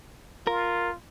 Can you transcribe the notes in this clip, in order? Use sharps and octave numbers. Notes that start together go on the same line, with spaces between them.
F4 A#4